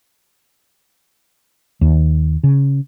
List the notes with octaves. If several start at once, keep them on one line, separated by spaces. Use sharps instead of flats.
D#2
C#3